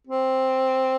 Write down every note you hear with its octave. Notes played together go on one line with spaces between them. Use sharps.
C4